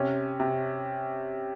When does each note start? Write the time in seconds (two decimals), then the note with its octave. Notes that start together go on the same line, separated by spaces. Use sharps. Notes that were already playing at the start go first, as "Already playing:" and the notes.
Already playing: C3 C#4
0.40 C3